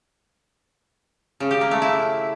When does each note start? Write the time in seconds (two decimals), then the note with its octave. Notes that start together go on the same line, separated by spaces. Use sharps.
1.40 C#3
1.51 G4
1.61 A#3
1.71 A3
1.82 E4